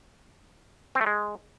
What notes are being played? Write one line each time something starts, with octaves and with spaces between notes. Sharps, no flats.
C4
A3
G#3